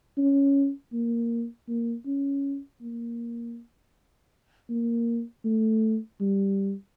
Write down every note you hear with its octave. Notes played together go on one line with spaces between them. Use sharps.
C#4
A#3
A#3
C#4
A#3
A#3
A3
G3